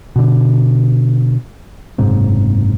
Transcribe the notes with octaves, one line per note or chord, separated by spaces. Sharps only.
B2 D3
F#1 G#2 C3